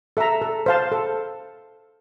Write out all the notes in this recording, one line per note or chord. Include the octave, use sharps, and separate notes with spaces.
A4 E5 A#5
A4
C5 F5 A5
A4